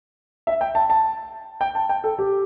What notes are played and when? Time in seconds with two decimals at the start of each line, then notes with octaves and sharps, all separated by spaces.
0.47 E5
0.61 G5
0.75 A5
0.90 A5
1.61 G5
1.75 A5
1.89 G5
2.04 A4
2.18 G4